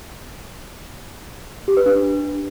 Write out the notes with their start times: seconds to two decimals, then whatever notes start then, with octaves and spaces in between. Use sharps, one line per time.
1.68 G4
1.77 B4
1.86 D4